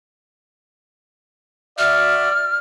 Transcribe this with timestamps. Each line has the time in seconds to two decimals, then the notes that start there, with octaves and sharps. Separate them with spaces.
1.79 F#4 D5 E5 F6